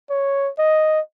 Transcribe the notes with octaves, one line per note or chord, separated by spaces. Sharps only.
C#5
D#5